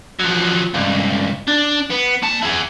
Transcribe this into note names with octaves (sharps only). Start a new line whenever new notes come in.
F3 F#3
C#2 G2
D4
B3
A#3 A5
E4 G#4